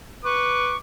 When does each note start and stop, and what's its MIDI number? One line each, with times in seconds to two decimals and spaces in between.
0.25 0.73 71
0.25 0.76 85
0.25 0.79 86